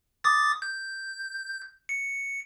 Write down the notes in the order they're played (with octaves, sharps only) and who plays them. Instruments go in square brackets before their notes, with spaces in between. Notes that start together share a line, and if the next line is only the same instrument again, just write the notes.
[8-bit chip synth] D6 D#6 A6
G6
C#7